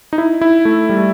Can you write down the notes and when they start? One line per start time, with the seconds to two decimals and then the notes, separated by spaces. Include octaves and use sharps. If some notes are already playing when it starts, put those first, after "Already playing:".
0.13 D#4
0.18 E4
0.41 E4
0.65 A3
0.90 G3
0.98 A3